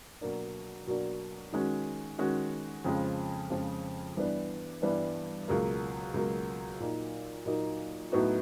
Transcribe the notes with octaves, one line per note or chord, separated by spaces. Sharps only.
B2 F#3 A#3 D4
B2 F#3 A#3 D4
D#3 G#3 C#4 F#4
D#3 G#3 C#4 F#4
F2 C#3 F3 G#3
F2 C#3 F3 G#3
G2 E3 G3 B3 D4
G2 E3 G3 B3 D4
C#2 B2 F#3 A#3
C#2 B2 F#3 A#3
A#2 F#3 A#3 D#4
A#2 F#3 A#3 D#4
A2 F#3 B3 D#4 F#4